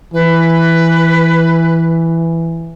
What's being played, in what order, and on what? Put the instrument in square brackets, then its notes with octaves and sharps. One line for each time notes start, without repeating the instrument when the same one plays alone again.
[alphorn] E3 [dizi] B4